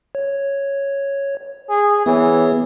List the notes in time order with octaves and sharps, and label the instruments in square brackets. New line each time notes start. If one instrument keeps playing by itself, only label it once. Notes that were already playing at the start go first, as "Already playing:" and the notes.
[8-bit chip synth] C#5
[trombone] G#4
[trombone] E3 [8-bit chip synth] B3 G#4 C#5